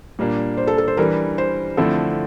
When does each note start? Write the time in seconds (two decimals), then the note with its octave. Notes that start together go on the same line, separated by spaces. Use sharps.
0.19 A#2 G3 A#3 D4
0.57 C5
0.67 A4
0.78 A4
0.88 C5
0.97 E3 G3 D4 A#4
1.38 C5
1.77 D3 F3 A3 C4 E4 A4